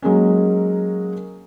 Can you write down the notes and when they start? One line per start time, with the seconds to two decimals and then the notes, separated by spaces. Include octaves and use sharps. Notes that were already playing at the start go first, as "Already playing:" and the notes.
0.02 F#3 G#3 A#3 C#4